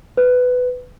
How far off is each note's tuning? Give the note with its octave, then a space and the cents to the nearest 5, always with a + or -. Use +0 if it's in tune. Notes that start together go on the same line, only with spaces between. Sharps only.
B4 +15